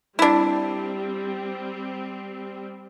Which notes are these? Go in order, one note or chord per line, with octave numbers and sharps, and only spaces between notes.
G3 C4 D4 E4